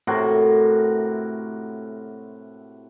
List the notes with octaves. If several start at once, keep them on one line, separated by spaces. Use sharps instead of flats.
A2 C3 F#4 A#4